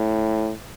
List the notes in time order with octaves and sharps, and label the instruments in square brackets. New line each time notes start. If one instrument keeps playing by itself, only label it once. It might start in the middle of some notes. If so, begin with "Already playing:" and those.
Already playing: [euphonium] A2